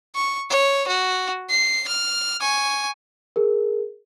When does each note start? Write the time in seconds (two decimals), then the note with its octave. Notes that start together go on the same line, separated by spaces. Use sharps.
0.15 C#6
0.50 C#5
0.87 F#4
1.50 C7
1.88 F6
2.41 G#5 C#6
3.36 G#4 A#4